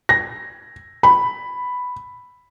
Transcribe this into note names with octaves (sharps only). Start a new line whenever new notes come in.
A#6
B5